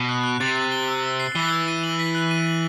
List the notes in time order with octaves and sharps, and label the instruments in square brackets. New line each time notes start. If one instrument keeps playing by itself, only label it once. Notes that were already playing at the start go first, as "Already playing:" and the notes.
Already playing: [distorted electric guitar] B2
[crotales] F#6
F#6
[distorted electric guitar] C3 [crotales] A6
[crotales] A6
G7
E6
E6
C7
[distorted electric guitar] E3 [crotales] G7
[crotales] E6
D#7
F#7
B6
F#6
D#7
F#7